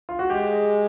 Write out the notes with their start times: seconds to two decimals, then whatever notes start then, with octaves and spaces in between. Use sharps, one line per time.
0.09 F4
0.19 F#4
0.30 G#3 G4